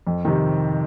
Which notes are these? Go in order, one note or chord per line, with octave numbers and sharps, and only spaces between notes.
F2
C3 D#3